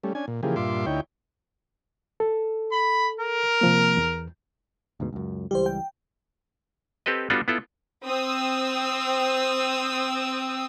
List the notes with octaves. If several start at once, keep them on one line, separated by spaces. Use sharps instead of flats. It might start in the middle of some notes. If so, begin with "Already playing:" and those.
G3 A3 C#4
C#4 D4 G#5
A#2
C#3 E3 F3 A#3 G4 G#4
G2 A#2 F4 E5 C6 D6
D2 D#4 E4 C#5 G5
A4
B5
A#4
C3 F3 A#3
E2
D2 G#2 B2
C#2 F#2
C#2 E3 G3 G4 C5
G5
C4 G4 A4 B4 D#5
G3 B3 D4 F4 F#4 A4
B3 E4 F4 A4
C4 D#6 E6